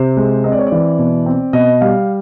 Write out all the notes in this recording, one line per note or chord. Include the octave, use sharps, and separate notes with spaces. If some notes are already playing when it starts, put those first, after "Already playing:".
Already playing: C3 C5
G#3
C4 D#5
D5
C#5
D5
E3
B2
C4
B2 D#5
G3 F5